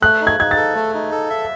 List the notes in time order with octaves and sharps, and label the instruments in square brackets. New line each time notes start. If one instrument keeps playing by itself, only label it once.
[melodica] A3 [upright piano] F#6
[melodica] D#4
[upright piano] G#6
[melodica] D#4 [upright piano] G#6
[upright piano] A6
[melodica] A4
A3
D#4
A4
E5